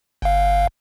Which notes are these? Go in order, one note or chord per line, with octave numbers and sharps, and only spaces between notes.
G1 F5